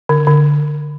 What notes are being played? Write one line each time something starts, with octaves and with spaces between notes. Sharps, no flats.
D3
D3